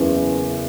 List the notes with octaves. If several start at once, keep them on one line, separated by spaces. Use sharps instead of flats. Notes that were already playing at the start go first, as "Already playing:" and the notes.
Already playing: F#1 E2